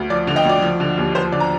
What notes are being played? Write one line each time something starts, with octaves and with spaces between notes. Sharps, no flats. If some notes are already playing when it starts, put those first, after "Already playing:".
Already playing: D2
F3 D5
D3
D#5 G5
D2 D5
F3
D3
D#2
F3 C5
D3 D5
A#5